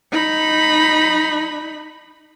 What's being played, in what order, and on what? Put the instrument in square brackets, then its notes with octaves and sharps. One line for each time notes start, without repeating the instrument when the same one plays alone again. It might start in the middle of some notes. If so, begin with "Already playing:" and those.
[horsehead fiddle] D#4 B5